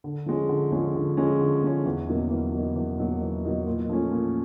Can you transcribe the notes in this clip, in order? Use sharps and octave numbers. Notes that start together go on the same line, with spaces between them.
D3
F3 G#3 C#4
D3
F3 G#3 C#4
D3
F3 G#3 C#4
D3
F3 G#3 C#4
E2
B2 F#3 A#3 D#4
E2
B2 F#3 A#3 D#4
E2
B2 F#3 A#3 D#4
E2
B2 F#3 A#3 D#4
A#2
F3 A3 C#4
A#2